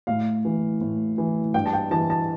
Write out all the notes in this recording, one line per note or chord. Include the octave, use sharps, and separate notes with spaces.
A2 F5
E3
A2
E3
G2 G5
A5
G5
E3 A5
A5